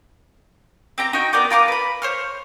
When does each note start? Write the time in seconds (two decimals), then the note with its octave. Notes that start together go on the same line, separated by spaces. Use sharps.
0.98 C4 G4 A#5
1.13 D#4 F#4 G5
1.33 B3 A#4 D5 G5
1.50 F4 A#4 C6 D6
1.68 B4 B5
2.02 C5 C#5 F6